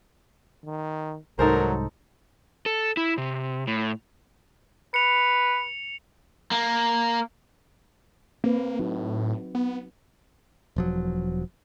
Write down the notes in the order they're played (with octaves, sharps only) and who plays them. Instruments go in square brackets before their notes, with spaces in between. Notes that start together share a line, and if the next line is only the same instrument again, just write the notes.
[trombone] D#3
[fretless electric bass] C2 G#2 [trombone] F#3 [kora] D#4 A4 C5 [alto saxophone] A#4
[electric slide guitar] A4
E4
C3
A2
[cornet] B4 [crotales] C#7 F7
[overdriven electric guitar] A#3
[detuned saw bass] A#3 [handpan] C4 B4
[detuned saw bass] A2 [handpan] F#3 D#4 F#4
[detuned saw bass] B3
[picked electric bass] E1 F3 F#3